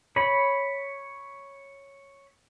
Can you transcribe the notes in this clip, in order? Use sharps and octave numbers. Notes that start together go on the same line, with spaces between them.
C#5 B5